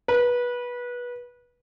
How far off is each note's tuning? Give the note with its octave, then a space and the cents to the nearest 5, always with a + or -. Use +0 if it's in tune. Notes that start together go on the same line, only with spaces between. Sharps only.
B4 -20